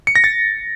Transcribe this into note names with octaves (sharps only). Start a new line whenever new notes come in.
C#7
A#6
A6